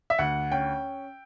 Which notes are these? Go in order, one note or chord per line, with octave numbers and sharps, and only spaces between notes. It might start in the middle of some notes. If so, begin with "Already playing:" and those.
E5
D2 F#5
C#4 G5